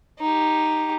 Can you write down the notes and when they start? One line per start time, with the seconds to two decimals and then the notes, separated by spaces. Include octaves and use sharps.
0.20 D#4 G4